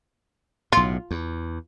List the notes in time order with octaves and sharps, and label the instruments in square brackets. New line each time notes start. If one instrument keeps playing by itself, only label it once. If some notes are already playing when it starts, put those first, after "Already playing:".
[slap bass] B1 A2 [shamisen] F4
[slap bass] E2